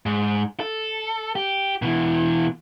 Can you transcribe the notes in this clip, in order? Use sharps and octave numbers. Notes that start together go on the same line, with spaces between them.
G#2
A4
G4
B2 E3